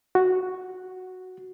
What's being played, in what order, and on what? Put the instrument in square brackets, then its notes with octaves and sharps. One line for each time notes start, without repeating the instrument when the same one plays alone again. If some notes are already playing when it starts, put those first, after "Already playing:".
[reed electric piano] F#4